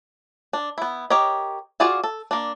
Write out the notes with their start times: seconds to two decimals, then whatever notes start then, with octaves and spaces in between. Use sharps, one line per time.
0.53 D4
0.78 B3 E4
1.10 G4 A#4 C#5 D#5
1.80 F4 F#4 G#4 D5 F5
2.04 A4
2.31 A#3 D4